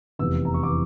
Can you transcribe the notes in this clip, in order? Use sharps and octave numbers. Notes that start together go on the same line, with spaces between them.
F1 E2 E3 E6
A#5
C#6
E3 D6